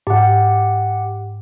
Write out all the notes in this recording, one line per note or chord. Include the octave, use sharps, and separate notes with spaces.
G#2 G4 F#5